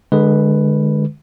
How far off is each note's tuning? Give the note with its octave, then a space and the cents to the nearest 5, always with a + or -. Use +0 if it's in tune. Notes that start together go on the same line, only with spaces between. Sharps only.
D3 +25 G#3 +0 B4 +0